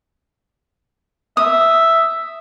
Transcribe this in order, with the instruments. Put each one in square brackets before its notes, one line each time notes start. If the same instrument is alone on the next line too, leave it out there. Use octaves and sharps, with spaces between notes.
[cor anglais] E5 [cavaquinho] D#6